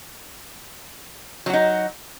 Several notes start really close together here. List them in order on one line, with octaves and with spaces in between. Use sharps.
F#3 F#4 D#4